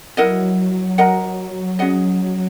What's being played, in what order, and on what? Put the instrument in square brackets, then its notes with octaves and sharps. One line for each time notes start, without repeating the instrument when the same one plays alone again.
[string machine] F#3 [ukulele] E4 A#4 D#5 F#5
[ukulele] A#4 D#5 F#5 A#5
C#4 G#4 D#5 F#5